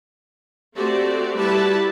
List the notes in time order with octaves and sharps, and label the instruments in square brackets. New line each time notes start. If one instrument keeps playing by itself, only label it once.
[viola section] A3 C4 F#4 G4 C5 D5
G3 E4 F#4 B4 A5 B5